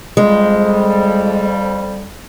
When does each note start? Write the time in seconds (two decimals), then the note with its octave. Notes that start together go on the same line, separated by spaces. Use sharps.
0.17 F2 G3 G#3